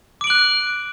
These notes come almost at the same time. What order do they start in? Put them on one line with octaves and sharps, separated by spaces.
D6 D7 F#7 F#6